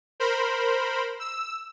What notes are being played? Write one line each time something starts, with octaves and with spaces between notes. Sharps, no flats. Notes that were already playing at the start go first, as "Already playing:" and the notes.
A#4 C5 B5
E6